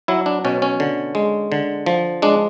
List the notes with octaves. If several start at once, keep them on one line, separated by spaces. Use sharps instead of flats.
F#3 E4
D4
B2 C#4
C#4
D3
G#3
D3
F3
G#3 D4